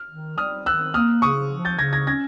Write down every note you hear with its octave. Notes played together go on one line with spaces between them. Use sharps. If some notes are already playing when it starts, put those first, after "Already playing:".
Already playing: F6
D#3
G3 D#6 F6
D#3 E6 F#6
A#3 D#6 F6
C#3 C#6 D#6
F3
G6 A6
C#3 G#6 A#6
G#6 A#6
C#4 G#6 A#6